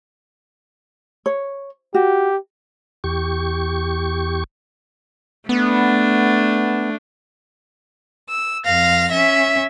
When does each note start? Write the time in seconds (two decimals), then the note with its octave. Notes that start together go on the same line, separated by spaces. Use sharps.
1.26 C#5
1.94 F#4 G4
3.04 E2 G4 C#6
5.49 A3 B3 D4
8.29 E6
8.66 F2 F5 A#6
9.13 C#4 E5